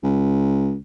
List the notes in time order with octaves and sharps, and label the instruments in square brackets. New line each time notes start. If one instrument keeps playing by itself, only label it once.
[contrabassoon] C#2